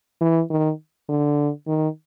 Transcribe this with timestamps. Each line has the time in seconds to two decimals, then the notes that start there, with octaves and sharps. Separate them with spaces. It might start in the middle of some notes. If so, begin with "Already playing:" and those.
0.21 E3
0.50 D#3
1.09 D3
1.67 D#3